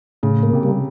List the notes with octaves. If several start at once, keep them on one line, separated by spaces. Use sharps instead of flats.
A2 C#3
A#3
C3
G3